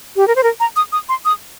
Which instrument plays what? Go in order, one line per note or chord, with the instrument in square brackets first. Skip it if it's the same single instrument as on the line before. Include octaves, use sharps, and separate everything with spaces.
[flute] G4
A#4
C5
A#4
A#5
D#6
D#6
C6
D#6